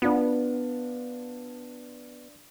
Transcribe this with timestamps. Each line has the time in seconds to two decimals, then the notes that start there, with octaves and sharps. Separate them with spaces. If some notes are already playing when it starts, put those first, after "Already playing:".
0.02 B3 D4 F4